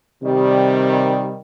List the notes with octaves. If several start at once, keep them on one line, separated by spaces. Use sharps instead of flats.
C3 D#3 G3